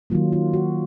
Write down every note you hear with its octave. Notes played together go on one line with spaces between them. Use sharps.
D#3 F#3 A#3 F4
F4
F#4